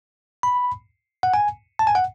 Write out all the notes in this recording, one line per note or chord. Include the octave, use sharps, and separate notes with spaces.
B5
F#5
G#5
A5
G#5
F#5